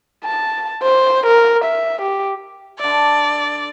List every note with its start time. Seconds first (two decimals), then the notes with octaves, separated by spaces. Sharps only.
0.24 A5
0.82 C5
1.26 A#4
1.64 E5
2.02 G4
2.79 D3 D5 E5